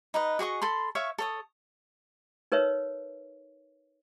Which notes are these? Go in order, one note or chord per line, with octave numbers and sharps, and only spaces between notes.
D#4 B4 D#5
F#4 G#4 D#5 C#6
A4 B5 C6
C#5 E5 F5 C#6
A4 C#5 D#6
D#4 A#4 B4 C#5 E5